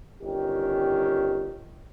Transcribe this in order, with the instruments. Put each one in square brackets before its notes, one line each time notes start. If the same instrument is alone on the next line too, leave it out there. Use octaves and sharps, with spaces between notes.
[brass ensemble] G1 D#3 C#4 G4